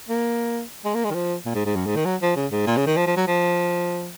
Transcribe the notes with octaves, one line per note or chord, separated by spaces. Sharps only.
A#3
G#3
A#3
G#3
D#3
F3
A#2
G#2
G#2
F#2
G#2
D#3
F#3
F3
C#3
G#2
A#2
C#3
D#3
F3
F3
F#3
F3